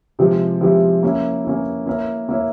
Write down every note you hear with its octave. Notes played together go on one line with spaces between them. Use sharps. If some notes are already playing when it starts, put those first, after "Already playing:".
C3 F3 G#3 E4 G4
C3 F3 G#3 E4 G4
A#3 C#4 E4
A#3 C#4 E4
A#3 E4 A#4 C#5
A#3 E4 A#4 C#5